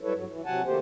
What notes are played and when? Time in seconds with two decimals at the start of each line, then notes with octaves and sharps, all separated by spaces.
0.01 F#3 G3 E4 A4 B4 C#5
0.14 G2 F#3
0.29 E3
0.46 C3 F#3 F#5 G#5 A5
0.65 D#3 A3 A#3 G4 C5